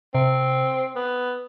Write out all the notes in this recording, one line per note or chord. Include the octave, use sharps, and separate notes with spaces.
C3 C4
B3